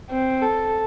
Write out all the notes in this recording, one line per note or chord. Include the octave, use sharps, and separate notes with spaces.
C4
A4